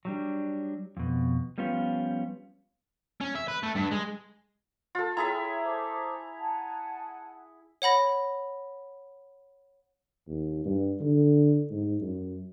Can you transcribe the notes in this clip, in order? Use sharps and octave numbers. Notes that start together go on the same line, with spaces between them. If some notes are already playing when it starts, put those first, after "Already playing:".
F#3 G3 D4
F2 B2
F3 G3 B3 C#4 F4
C#4
E5
B4
A3
G2
G#3
F4 A4
E4 G#4 C#5 E5 G5 A#5 C6
A4 C5 D6
F#5 G#5 A5
C#5 F#5 B5 A#6
D#2
G2
D3
G#2
F#2